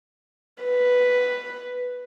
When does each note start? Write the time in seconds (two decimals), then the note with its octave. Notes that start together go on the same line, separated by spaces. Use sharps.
0.63 B4